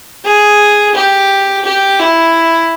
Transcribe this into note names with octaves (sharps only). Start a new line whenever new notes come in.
G#4
G4
G4
E4